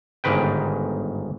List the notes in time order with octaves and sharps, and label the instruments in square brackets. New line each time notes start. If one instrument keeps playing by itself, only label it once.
[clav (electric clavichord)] G1 G#2 D#3 B4 G5